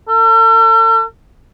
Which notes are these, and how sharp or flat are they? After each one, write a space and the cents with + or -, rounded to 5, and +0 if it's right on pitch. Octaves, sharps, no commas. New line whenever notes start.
A4 +45